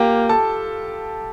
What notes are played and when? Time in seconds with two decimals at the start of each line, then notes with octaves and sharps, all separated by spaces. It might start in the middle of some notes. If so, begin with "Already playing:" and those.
Already playing: A#3 F4 G4 G5
0.29 A4 A5